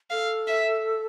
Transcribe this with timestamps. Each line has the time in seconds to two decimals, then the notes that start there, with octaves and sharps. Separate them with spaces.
0.11 A4 F5
0.47 E5